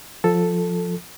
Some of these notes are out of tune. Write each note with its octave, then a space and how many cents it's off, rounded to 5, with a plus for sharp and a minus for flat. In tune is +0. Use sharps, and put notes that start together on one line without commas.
F3 +10 A4 +0